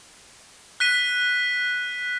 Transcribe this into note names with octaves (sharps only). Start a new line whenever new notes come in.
F#6 B6 D#7